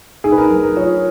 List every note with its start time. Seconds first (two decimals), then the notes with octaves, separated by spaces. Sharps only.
0.24 D#4 G#4
0.32 B4
0.38 A#4
0.51 F#3 A#4
0.63 A#4
0.76 F4 C#5